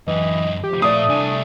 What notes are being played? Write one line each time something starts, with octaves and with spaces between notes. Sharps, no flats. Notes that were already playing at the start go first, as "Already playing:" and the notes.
F#2 E3 G4 D#5
F3 G4
A#2 A3 D5 F5 D#6
C2 D4 G#5